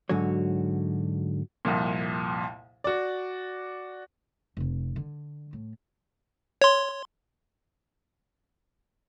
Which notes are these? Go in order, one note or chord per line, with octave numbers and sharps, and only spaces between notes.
G#2 D3 F#3 F#4 C#5
C2 F2 A#2
F#4 D5
F1 C3
D3
A2
C#5 C6